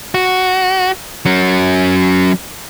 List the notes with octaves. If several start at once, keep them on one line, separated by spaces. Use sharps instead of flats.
F#4
F#3 C#4